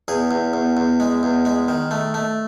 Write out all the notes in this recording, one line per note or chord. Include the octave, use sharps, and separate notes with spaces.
E2 G#4
E2
E2
E2
G#3
E2
G#3
D#3
A3
A3